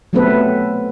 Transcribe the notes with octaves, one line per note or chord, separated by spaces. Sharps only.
F#3 A3 B3 C4 A4 B4